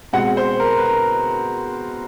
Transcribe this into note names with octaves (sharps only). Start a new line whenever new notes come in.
B2 G#3 C4 F#5
C5
A#4
B4
A#4